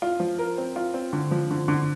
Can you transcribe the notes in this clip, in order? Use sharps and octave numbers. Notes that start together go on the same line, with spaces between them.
F4
F3
A#4
C4
F4
C4
D3
F3
D3
D3